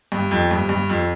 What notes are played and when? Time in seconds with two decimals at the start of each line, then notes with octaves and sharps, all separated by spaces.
0.12 G2
0.31 F2
0.51 G2
0.69 G2
0.90 F2